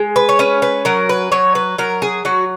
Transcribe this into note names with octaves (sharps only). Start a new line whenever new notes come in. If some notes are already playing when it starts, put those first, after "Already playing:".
Already playing: G#3
B4
C#5
C#4 B4
B4
F#3 A#4
B4
F#3 C#5
B4
F#3 A#4
G#4
F#3 F#4